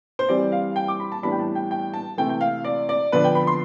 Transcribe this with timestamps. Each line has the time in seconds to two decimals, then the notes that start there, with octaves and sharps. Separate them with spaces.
0.19 C5
0.29 E3 G3 C4 D5
0.52 F5
0.76 G5
0.88 D6
1.00 B5
1.12 A5
1.23 A2 E3 G3 B3 D4 B5
1.32 G5
1.39 A5
1.55 G5
1.71 G5
1.93 A5
2.18 C3 E3 A3 G5
2.29 G5
2.41 F5
2.65 D5
2.89 D5
3.12 D3 F3 B3 D4 B4
3.24 G5
3.35 B5
3.47 C6